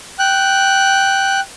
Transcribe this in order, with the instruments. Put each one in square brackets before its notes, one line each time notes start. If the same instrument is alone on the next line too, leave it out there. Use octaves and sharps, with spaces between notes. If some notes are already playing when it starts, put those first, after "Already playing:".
[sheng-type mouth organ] G5 F#6